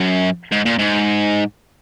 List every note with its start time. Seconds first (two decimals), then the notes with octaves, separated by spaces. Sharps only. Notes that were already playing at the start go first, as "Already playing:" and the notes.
Already playing: F#2
0.52 G#2
0.66 A#2
0.79 G#2